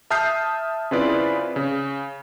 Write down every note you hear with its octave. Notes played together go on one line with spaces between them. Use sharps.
E5 A5 D#6 F6 G6 C7
C#3 C4 E4 F4 B4 D5
C#3